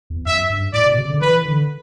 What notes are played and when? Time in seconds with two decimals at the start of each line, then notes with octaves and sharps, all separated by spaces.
0.10 E2
0.26 F#2 E5
0.50 G2
0.73 A2 D5
0.86 B2
0.97 C#3
1.10 D3
1.21 E3 B4
1.45 D3